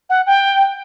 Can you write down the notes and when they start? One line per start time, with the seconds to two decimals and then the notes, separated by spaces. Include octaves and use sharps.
0.10 F#5
0.26 G5